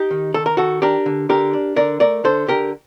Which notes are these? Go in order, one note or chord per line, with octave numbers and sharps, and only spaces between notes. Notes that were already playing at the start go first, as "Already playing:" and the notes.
Already playing: D#4 G4
D#3
D#3 A4
A#4
D#3 F#4 A4
D4 G4 A#4
D3
D3 G4 A#4
D4
D3 A#4 D5
A3 A#4 D5
D3 A4 C5
D3 G4 A#4